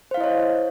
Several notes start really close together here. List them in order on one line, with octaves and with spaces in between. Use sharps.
C5 F5 E4 D#5 C#5